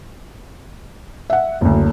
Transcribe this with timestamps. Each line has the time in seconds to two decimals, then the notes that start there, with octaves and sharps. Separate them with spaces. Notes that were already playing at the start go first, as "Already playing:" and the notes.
1.30 E5 F#5
1.61 F#1 D2